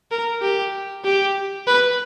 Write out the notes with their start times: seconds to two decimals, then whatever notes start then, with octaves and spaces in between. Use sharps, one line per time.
0.11 A#4
0.42 G4
1.04 G4
1.67 B4